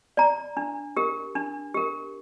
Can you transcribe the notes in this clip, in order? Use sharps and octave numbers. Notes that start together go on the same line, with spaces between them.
D5 A#5
D4
G4 A#4
D4
G4 A#4